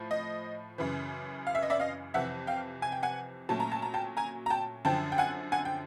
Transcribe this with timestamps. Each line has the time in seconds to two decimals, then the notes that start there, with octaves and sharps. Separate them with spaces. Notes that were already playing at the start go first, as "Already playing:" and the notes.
Already playing: A2 F3
0.11 D#5
0.78 F#2 C#3 E3
1.47 F5
1.55 E5
1.63 D#5
1.70 D5 E5
1.80 D#5 F5
2.14 F2 C3 E3 E5 F#5
2.47 F5 G5
2.82 G#5
2.92 G5
3.03 F#5 G#5
3.49 A#2 F#3 A3 C#4 A5
3.60 A#5
3.72 A5
3.82 A#5
3.94 G5 A5
4.17 G#5 A#5
4.46 A#5
4.50 G5 A5
4.85 F#2 D3 F3 G5 A5
5.12 G5
5.18 F#5 G#5
5.52 F#5 G#5
5.65 G5